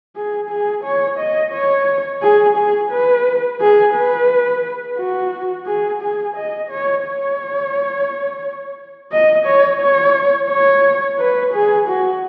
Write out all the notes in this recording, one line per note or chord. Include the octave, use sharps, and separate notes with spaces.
G#4
G#4
C#5
D#5
C#5
G#4
G#4
B4
G#4
B4
F#4
G#4
G#4
D#5
C#5
C#5
D#5
C#5
C#5
C#5
B4
G#4
F#4